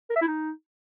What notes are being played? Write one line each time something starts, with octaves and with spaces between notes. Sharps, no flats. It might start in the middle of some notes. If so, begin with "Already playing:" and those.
A#4
E5
E4
D#4